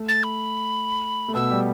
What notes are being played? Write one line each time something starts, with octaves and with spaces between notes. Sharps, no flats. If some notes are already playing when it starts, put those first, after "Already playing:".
Already playing: A3
A6
B5
A3
B2 B3 E6
G3 G4